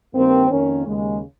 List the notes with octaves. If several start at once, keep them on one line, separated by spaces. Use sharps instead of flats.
G2 D#3 A#3 C4
F2 D#3 A#3 C#4
D#2 C#3 G#3